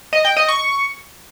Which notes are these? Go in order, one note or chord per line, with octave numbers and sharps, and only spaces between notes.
D#5
G5
D#5
C#6